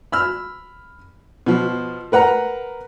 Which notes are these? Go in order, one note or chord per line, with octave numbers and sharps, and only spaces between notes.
B5 E6 F6
B2 F3
A#4 B4 F#5 A#5